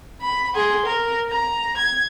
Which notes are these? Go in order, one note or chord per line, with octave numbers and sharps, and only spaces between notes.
B5
G#4 C6
A#4
A#5
G#6